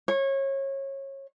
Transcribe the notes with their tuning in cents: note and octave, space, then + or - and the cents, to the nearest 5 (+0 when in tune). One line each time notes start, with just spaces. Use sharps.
C#5 -25